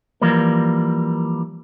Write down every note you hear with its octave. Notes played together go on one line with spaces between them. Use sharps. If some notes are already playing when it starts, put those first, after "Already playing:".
E3 F3 G3 A#3